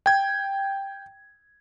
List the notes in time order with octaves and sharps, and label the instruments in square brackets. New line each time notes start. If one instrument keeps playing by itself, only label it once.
[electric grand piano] G5 G#6